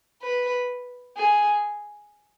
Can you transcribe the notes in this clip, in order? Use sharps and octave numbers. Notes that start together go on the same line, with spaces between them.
B4
G#4